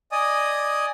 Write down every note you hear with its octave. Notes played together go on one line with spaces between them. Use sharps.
D5 D#5 G#5 D#6